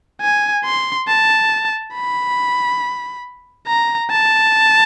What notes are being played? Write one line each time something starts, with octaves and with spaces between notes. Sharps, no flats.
G#5
C6
A5
B5
A#5
A5